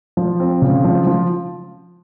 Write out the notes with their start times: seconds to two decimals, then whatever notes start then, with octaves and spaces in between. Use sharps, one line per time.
0.17 F3
0.40 C4
0.62 C#3
0.84 F3
1.07 F3